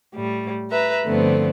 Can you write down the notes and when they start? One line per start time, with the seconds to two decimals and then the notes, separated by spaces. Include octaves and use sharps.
0.15 A2 G3
0.71 B4 E5 A#5
1.06 G2 D3 F3 A3 B3 C4